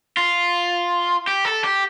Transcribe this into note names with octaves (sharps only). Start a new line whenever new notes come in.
F4
G4
A4
G4